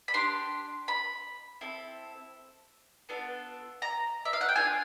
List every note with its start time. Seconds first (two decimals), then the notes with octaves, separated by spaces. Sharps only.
0.08 B5
0.14 D4 G4 C6
0.88 B5
1.61 C4 E4 A4
3.09 B3 D4 F4 A4
3.82 A#5
4.25 E5
4.33 F5
4.41 F#5
4.49 G5
4.56 D4 F4 G#4 G#5